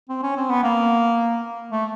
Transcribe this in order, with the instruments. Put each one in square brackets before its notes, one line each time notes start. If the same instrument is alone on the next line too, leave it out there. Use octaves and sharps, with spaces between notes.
[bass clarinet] C4
C#4
C4
B3
A#3
A3